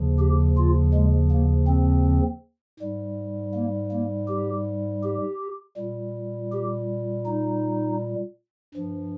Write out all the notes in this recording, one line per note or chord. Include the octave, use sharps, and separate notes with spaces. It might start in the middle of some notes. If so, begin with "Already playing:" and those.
Already playing: D#2 C#3 F3
G4
F4
G#3
A#3
C4
G#2 G3
A#3
A#3
G4
G4
A#2 G3
G4
D#4
G2 F3